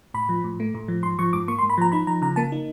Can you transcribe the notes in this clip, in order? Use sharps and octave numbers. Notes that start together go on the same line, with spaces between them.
A2 B5
F3
A2
A3
A2
F3
G#2 C6
F3 C#6
G#2 D6
A#3 C#6
C6
G#2
B5
F3 A#5
D#4 B5
F3 A#5
C#3 A#5
A#3 A5
D#4